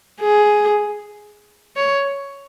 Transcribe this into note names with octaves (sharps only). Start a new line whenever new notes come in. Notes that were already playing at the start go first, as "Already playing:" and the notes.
G#4
C#5